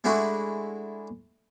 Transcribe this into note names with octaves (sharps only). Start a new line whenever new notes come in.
G#3 A3 D4 E4 F#4